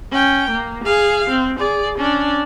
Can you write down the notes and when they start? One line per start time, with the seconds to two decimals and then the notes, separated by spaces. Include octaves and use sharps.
0.11 C#4 G5
0.50 A#3
0.84 G#4 F5
1.30 C4
1.58 G#4 D5
1.98 C#4 D4